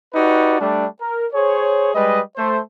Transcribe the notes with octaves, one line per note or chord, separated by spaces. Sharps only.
D#4 F#4 G4 B4 D5
G3 A3 D4
A#4
G#4 C5 C#5
G3 G#3 B4 D#5
A3 C5